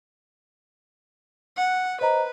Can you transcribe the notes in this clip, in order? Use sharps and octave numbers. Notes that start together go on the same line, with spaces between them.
F#5
B4 C5 D#5 A#5